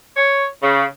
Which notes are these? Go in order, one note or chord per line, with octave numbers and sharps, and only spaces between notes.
C#5
C#3